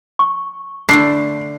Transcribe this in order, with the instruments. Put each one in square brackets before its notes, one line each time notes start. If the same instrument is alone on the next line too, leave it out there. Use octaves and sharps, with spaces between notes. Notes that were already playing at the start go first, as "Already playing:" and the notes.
[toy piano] C#6
[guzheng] D3 A3 E4 [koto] D4 [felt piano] C7